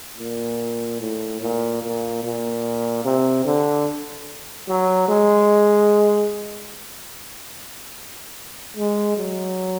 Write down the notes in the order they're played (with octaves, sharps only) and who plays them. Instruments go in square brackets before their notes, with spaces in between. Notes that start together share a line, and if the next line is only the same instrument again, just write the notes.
[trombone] A#2
A2
A#2
A#2
A#2
C3
D3
F#3
G#3
G#3
F#3